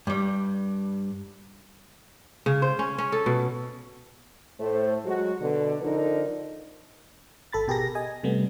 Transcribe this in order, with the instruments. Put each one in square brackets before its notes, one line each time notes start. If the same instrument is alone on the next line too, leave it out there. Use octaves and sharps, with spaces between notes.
[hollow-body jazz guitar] G2 G3
[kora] C#3
C5
C#4
C#4
A4
B2
[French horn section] A2 A3 C5
F#3 G#3 F#4
B2 D3
D3 F3 D4 D#4 A#4
[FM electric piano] G#1 A4 B5 A6
B2 G4 G#4 A#4 A#6
D#5 G#5
C3 G3 A3 B3